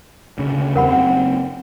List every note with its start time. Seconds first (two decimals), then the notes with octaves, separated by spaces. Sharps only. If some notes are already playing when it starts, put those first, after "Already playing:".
0.38 D2 C#3
0.76 E2 G3 C4 A#4 F#5 B5
0.89 F#1 C4 F#4 F#5